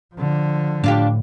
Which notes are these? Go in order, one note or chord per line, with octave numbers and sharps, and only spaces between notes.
D3 F3
A2 D4 F4 G4